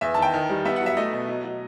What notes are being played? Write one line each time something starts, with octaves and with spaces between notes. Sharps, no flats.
E2 E5
D#3 A5
G5
D#3
G3
B3 E5
F#5
F#3
E5
A3 D#5
B2
F#3
F#3